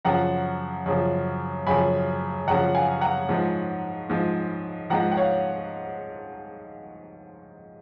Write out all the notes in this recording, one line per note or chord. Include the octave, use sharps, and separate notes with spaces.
F#2 C#3 F3 F#5 A#5
F#2 C#3 F3
F#2 C#3 F3 G#5 B5
F#2 C#3 F3 F#5 A#5
F5 G#5
F#5 A#5
G#2 F3
G#2 F3
G#2 F3 F#5 A#5
F#5
C#5 F5